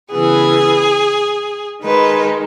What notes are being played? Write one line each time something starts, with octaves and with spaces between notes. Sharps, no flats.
C#3 E3 B3 G#4
D#3 G#3 D#4 B4